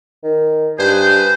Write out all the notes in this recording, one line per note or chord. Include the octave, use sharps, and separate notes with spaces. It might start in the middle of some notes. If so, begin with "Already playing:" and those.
D#3
G2 G#4 B4 C5